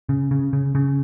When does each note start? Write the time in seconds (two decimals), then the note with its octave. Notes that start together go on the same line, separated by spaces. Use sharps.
0.09 C#3
0.31 C#3
0.53 C#3
0.75 C#3